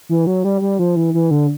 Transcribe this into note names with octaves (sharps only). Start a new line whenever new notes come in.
E3
F#3
G3
G3
F3
E3
E3
D3